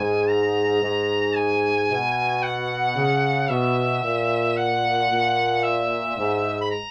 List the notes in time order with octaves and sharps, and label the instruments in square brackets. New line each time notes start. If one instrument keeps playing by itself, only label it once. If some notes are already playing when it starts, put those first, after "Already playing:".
Already playing: [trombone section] G#2 [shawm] G#5
[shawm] A#5
[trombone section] G#2
[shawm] G#5
[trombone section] B2
[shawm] F#5
[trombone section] C#3
[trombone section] B2 [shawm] E5
[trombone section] A#2
[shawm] F#5
[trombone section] A#2
[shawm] E5
[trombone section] G#2
[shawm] B5
A#5